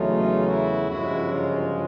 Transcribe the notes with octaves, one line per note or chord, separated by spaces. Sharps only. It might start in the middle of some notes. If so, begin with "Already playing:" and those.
Already playing: E2 C#3 F#3 A3 D#4 F4
E4 F#4
G1 F#2 C#3 F3 G#3 E4 F#4
D#4 F4